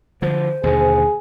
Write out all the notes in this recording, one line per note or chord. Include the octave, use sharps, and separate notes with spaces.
D3 F3 C5
D#2 B2 D3 G#4